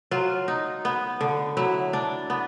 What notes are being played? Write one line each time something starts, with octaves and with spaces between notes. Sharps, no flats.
F#3 F4
D#4
B3
D3
F#3 E4
D4
B3